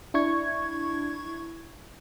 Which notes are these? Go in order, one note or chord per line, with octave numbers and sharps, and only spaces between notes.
D4 E4 C#6 G#6